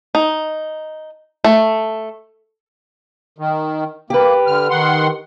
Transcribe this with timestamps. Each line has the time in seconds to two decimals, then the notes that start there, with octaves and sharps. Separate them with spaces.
0.15 D#4
1.44 A3
3.38 D#3
4.10 A#3 G4 B4
4.47 D3 F6
4.70 D#3 F#5 C6